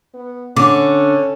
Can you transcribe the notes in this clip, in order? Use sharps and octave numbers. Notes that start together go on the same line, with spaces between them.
B3
D3 C#4 D6